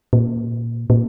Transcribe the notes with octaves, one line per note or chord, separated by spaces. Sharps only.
A#2
A#2